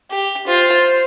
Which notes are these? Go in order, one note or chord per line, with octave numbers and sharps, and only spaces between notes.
G4
F4 C5